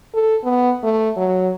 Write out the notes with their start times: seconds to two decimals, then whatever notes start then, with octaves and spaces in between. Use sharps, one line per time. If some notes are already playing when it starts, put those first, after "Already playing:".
0.14 A4
0.44 B3
0.84 A3
1.17 F#3